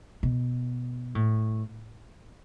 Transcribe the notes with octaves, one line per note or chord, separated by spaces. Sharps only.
B2
A2